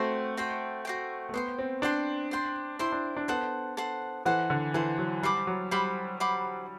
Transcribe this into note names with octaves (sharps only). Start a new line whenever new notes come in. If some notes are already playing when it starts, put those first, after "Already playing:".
Already playing: A3 C4 F#4 C5 G5
F#4 C5 G5
F#4 C5 G5
A3
B3 C5 G5 C6
C4
D4 C5 G5 C6
C5 G5 C6
E4 C5 G5 C6
D4
D4
B3 A4 C5 F#5
A4 C5 F#5
E3 A4 C5 F#5
D3
E3 A4 C5 F#5
F#3
G3 C5 F#5 B5 D6
F#3
G3 C5 F#5 B5 D6
C5 F#5 B5 D6